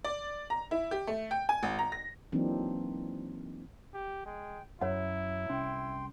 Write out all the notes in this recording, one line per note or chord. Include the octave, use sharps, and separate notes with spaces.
D5
A#5
E4
G4
A3
G5
G#5
G#1
A#5
A#6
E3 F#3 A#3 C4 D4 D#4
G4
G#3 G5
F#2 F#3 E4 C#5 F#5
C2 C#4 G5 C6